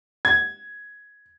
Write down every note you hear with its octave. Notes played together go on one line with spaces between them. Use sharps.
G#6